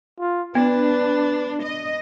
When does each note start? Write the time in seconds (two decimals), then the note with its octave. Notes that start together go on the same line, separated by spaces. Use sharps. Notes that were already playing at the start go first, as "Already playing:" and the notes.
0.20 F4
0.55 B3 D4 B4
1.62 D#5